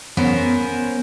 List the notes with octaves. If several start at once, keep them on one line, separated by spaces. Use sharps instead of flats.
B3 C#4 A#4 C5